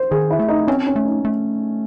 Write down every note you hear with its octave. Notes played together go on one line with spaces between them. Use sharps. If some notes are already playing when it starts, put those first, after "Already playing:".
Already playing: C5
D#3 G#4
E4
A3
D#4
C4 C#4
C#4
A3
D#4
A3